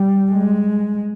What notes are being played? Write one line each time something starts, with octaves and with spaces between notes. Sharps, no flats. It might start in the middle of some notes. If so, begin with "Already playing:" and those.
Already playing: G3
G#3